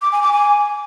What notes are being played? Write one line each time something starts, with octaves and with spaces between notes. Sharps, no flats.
D6
G#5
D6
G#5